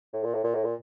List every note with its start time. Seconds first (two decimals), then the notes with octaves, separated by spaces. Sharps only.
0.13 A2
0.24 A#2
0.34 A2
0.44 A#2
0.55 A2
0.64 A#2